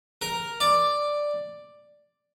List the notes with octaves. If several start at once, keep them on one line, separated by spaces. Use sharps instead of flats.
A#4
D5